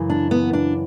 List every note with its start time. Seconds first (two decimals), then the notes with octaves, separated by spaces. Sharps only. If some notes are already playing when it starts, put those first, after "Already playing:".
Already playing: F#2 C#3 E3
0.10 D4
0.31 B3
0.53 D4